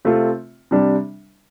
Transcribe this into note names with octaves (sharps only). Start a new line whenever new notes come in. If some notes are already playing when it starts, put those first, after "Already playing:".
C3 A3 C4 F4
C3 G3 D4